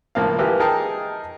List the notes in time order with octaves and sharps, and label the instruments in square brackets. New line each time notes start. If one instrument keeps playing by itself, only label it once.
[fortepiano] C#2 A2 F3 A#3 F5
E3 F3 A#3 G4
D#4 G#4 A#4 G5 A5